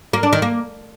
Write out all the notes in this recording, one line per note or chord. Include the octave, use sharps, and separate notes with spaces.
A#3
D4
D#3
A#3